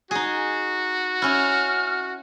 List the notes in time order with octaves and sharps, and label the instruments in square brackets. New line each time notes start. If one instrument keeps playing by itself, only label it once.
[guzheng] D#4 G#4 [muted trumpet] F#4
[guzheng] C#4 E4 [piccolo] F6